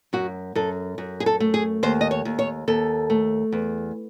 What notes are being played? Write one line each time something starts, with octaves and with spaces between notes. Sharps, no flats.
F#2 F#4
F#2 A4
F#2
G#4
A4
A3
G#4
D#2 C5
D#5
C#5
D#2
C#5
D#2 A4
A3
E2